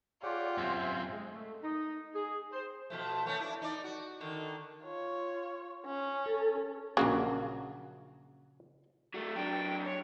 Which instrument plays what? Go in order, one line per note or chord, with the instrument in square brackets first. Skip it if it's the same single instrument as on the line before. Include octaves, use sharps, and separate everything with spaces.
[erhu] F4 [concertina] G4 F#5 G5 [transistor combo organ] G#4 C#5 D5
[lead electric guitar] F#2 C4 [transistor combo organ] C5 E5 G#5
[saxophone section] G#3
A3
D#4
G#4
C5
[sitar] B2 F3 A3
A3 B3 C#4
D4 E4
D#4 D5
F#4
D3 D#3
[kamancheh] F4 C#5
C#4
[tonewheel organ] A4
[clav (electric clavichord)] A#1 A#3 F#4 [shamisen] C#3 F#3
[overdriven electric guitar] F#3 A3
[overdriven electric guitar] F#3 D4 [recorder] G5
[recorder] C#5